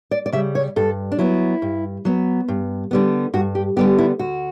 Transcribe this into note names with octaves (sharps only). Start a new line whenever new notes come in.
D5
D5
C#3 G3 E5
C#5
G2 A4
D4
F#3 B3 E4
G2
F#3 B3
G2
D3 G3 B3
G2 F#4
G4
D3 G3 B3 G4
E4
D2 F#4